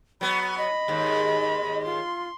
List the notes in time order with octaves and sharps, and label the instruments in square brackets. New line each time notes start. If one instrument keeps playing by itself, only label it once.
[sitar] F#3 B3 [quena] B5
[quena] D#5 [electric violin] B5
[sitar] D#2 G#2
[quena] F4 [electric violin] C6